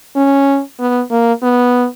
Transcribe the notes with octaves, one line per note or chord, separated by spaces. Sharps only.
C#4
B3
A#3
B3